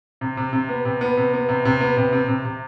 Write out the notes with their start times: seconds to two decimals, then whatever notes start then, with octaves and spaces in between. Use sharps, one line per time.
0.21 C3
0.37 C3
0.53 C3
0.69 B3
0.85 C3
1.01 B3
1.17 C3
1.34 B3
1.49 C3
1.65 C3
1.81 B3
1.97 C3
2.13 C3
2.28 C3
2.45 C3